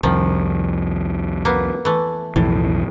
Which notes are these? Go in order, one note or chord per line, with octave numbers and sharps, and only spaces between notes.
C2 F2 D#3 F3
A#3 B3
E3 A3
B1 F2 A2 E3